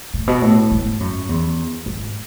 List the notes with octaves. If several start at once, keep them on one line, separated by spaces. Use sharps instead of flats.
A2
B2
A2
G#2
F#2
E2
G#2